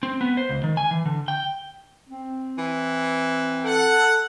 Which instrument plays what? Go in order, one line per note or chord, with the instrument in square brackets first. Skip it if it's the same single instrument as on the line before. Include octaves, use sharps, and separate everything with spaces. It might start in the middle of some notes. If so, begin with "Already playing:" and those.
[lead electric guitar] C4
B3
C5
C#2
D#3
G#5
E3
D3
G5
[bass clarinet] C4
[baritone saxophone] E3
[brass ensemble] A4 F#5